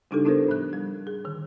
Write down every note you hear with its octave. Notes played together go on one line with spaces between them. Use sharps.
C#3 G3 D4 D#4 G4 A4
B3 D4 E4 A4 A#4 C5
A2 F3 F#6
G3
G#4
D3 D#3